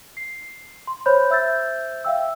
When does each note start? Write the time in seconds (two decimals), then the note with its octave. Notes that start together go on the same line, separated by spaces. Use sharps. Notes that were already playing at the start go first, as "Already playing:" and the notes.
0.17 C7
0.87 C6
1.06 C5 C#5 B5 G6
1.29 C5 E5 E6 G6 A6
2.05 E5 F5 G5 E6